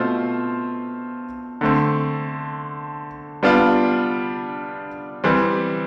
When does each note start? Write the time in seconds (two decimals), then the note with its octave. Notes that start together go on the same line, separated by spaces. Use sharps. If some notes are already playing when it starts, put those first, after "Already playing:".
Already playing: B2 A3 C4 F4 C5
1.61 D3 A3 C4
3.43 G3 B3 D4 F4
5.24 E3 G3 C4